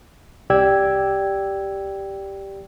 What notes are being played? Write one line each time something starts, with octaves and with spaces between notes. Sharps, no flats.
C2 G4 D5 G5 E6 G#6